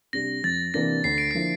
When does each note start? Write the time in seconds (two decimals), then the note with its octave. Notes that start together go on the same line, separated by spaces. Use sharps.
0.13 C3 G3 D4 G4 A#6
0.44 F2 A6
0.74 C3 E3 A#3 D4 A#6
1.04 D2 C7
1.18 D7
1.31 D3 F3 A#3 E4 C7